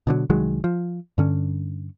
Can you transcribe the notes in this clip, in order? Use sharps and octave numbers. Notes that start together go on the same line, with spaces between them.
B2 D3 E3 F#3
C2 D#3 F#3 G#3
F3
G2 D3 C#4